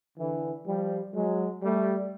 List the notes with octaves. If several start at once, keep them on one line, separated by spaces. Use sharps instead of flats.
D3 E3
F3 G3
F#3 G#3
G3 A3